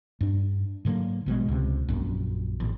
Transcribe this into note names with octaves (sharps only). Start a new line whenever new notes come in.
G2 D4
G#2 D3 F#3 A#3
A#1 B2 E3 G#3
C#2 C3
A#1 F#2
A1